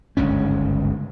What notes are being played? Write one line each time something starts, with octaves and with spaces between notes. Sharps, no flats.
G1 C#2 G#2 C#4